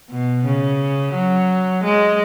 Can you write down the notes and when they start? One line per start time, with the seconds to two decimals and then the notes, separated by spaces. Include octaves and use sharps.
0.11 B2
0.46 C#3
1.14 F#3
1.84 G#3